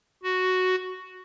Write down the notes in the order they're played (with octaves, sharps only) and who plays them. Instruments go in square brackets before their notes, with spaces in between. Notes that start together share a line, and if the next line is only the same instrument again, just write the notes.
[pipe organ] F#4